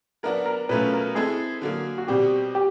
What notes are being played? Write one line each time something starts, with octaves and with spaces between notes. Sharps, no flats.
F#3 B3 D4 F#4 A#4
A#4
B2 F#3 A3 C#4 F4 B4
A#4
G#3 C4 E4 G#4 A4
D3 F#3 A#3
F#4
B2 G3 C4 G4
G4